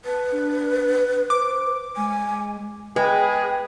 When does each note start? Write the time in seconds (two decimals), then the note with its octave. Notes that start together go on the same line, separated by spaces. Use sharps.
0.05 B4 A5
0.32 D4
1.30 C5 D6
1.97 G#3 G#5
2.96 G#3 G#4 B4 G5